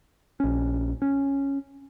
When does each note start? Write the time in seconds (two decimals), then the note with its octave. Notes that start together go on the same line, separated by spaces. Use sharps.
0.40 A#1 C#4
1.02 C#4